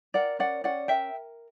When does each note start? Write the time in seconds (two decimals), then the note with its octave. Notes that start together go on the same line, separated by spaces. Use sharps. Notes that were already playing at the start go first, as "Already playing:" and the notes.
0.14 A#4 D5 F#5
0.39 C#4 D5 F#5
0.64 C#4 D5 F#5
0.88 A#4 E5 G5